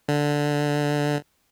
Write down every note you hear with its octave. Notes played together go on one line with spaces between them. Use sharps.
D3